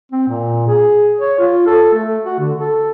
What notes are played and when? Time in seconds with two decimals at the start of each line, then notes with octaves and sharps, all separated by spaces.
0.12 C4
0.28 A#2
0.68 G#4
1.21 C#5
1.39 F4
1.67 A4
1.94 A3
2.25 F#4
2.39 D3
2.59 A4